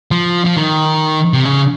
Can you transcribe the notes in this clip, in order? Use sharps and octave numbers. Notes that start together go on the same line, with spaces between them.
F3
F3
D#3
C3
C#3